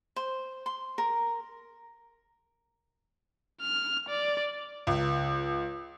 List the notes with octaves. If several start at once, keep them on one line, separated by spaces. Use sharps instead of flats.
C5
C6
A#4
F6
D5
C#2